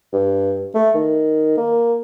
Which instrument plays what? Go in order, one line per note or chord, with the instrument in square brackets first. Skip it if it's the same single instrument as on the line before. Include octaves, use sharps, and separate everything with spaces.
[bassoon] G2
A3
D#3
A#3